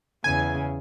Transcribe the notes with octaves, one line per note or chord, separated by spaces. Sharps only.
E2 C#3 G#5